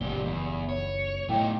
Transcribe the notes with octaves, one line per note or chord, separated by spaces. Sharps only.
F#1 B1 G2 A#2 G3 G7
E2
C#5
A2 F#3 A3 B3 D#4 E4 G5 D6